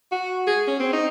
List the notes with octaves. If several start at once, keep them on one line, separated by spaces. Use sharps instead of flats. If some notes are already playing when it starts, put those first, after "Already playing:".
F#4
G#4
C#4
C4
D#4